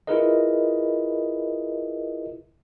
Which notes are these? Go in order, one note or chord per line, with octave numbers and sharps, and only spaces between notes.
E4 F4 G#4 A#4 B4 D#5